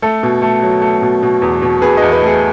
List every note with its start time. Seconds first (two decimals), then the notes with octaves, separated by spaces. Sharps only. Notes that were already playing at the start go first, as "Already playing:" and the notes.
0.02 A3 A4
0.23 B2
0.42 A3
0.62 F#3
0.82 A3
1.02 B2
1.23 B2
1.42 E2
1.62 B2
1.82 B2 G#4 B4
1.97 E2 B4 D#5
2.12 B4 D#5
2.21 A3
2.26 G#4